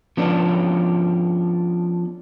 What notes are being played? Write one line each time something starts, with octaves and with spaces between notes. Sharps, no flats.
F3 B3 C#4 D4